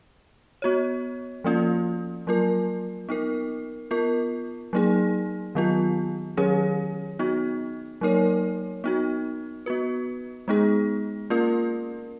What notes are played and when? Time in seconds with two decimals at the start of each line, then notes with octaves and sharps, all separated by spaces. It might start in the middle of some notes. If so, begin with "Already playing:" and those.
0.62 B3 F#4 C#5
1.44 F3 A#3 C#4 F4
2.27 F#3 A#3 F4 A#4
3.09 B3 D#4 A#4
3.91 B3 F4 A#4
4.73 F#3 A#3 D#4 G#4
5.55 D#3 F#3 B3 F4
6.37 D#3 F#3 C#4 G#4 C#5
7.19 B3 D#4 F#4
8.01 F#3 A#3 D#4 A#4 C#5
8.84 B3 D#4 F#4
9.66 B3 F#4 B4
10.48 G#3 B3 D#4 G#4
11.30 A#3 C#4 F4 A#4